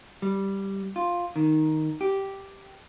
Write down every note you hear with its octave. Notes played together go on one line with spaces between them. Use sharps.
G3
F4
D#3
G4